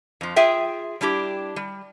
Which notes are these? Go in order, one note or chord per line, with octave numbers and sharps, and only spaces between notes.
F2 F3
F4 G#4 E5 G5
G3 D4 E4 G4
G3